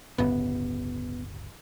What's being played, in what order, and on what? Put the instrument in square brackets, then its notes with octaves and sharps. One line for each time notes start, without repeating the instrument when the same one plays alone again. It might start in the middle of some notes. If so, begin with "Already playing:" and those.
[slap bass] D1 G1 C#3 [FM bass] B3